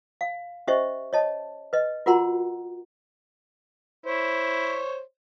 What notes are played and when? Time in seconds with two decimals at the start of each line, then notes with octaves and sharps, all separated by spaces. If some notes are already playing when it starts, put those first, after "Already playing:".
0.21 F5
0.67 C#4 G4 C5 D#5 E5 C#6
1.13 C#5 D#5 A5
1.73 B4 D#5
2.06 F4 F#4 A#4 F#5 A#5 C6
4.06 E4 C5 C#5